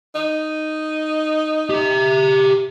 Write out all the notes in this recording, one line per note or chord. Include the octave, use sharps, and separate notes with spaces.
D#4
G4 E5